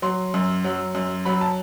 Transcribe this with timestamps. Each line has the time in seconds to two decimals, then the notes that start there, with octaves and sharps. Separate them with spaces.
0.02 F#3 C6
0.34 F#2
0.64 F#3
0.95 F#2
1.25 F#3 B5
1.41 A5